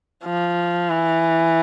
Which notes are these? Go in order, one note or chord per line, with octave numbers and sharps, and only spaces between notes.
F3
E3